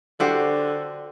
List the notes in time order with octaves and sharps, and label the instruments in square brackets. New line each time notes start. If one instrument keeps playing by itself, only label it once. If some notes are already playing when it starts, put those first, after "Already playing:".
[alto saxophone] D3 [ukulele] F#4 G4 C5